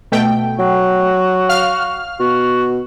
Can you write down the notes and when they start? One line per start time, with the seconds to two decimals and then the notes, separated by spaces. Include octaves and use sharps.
0.12 B2 A3 G5
0.59 F#3 F#4
1.49 F5 F6
2.20 B2 F#4